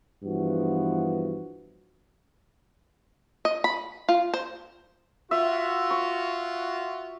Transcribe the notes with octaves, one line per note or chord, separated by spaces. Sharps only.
G2 E3 F3 B3 F#4
D#5
B5
F4
C5
F4 F#4 E5
C#6